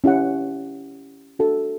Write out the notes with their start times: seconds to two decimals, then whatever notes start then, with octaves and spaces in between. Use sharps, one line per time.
0.04 C#4 E4 G4 C#5 F#5
1.39 D4 F#4 A4